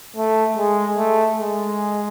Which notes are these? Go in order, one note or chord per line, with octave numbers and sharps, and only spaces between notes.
A3
G#3
A3
G#3